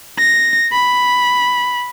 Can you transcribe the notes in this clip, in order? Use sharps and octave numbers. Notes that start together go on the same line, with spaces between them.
A#6
B5